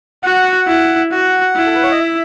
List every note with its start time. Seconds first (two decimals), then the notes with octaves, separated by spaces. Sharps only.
0.23 F#4 F#5
0.67 E4
1.12 F#4 F#5
1.56 E4
1.67 A4
1.75 B4
1.83 C#5
1.91 D#5
2.00 E5